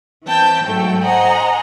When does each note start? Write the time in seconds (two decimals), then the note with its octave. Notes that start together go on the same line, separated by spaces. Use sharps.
0.25 E3 C4 G5 A5 G6
0.66 G#2 F#3 A3 A4 G5
1.03 C5 D#5 F#5 G#5 A#5